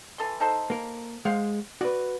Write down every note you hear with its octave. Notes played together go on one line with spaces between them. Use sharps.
E3 A4 C6
D#4 A4 C5
A#3 A#4
G#3 C5 F5 F#5
F#4 B4 D5